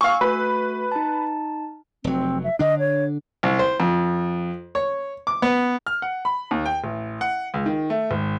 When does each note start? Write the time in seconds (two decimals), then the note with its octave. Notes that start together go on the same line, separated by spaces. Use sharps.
0.01 F5 G#5 C#6 E6
0.21 A3 F#4 B4 B6
0.92 D#4 A5
2.04 F1 F#3 C4
2.44 E5
2.59 D3 D4 D#5
2.79 C#5
3.43 C2
3.59 C5
3.80 F2
4.75 C#5
5.27 D6
5.42 B3
5.87 F6
6.02 F#5
6.25 B5
6.51 D#2
6.66 G5
6.84 A1
7.21 F#5
7.54 C#2
7.66 D#3
7.90 A3
8.11 G#1